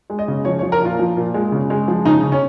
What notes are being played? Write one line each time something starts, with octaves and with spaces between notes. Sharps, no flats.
G#3
D#5
C#3
F3 C#5
C#5
F3
A#4
A#2 F4
F3
A#2
G#3
C#3
G#3
F3
C#3 D#4
C#3
C#4